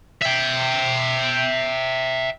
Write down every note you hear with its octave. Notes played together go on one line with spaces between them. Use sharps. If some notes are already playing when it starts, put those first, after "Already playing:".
E5 G5